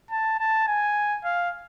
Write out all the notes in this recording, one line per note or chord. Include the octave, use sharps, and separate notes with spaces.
A5
A5
G#5
F5